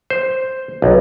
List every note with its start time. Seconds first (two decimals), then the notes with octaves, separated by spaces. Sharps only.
0.10 C5
0.82 B1